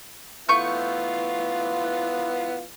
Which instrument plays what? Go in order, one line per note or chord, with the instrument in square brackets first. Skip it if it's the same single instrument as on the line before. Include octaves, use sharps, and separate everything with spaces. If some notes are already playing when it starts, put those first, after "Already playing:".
[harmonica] E3 B3 F4 [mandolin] A3 C#6 G6